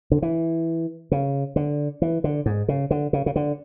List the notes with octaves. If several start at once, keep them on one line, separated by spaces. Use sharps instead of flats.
D3
E3
C#3
D3
E3
D3
G#2
C#3
D3
C#3
C#3
D3